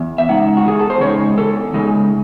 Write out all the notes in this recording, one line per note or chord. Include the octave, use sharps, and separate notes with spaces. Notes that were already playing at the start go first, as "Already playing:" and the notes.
Already playing: E2
E5
C#3 G#3 D#4 F#5
F#4
E2 G#4
A4
C5
C#3 G#3 D#4 C#5
E2 A4
C#3 G#3 D#4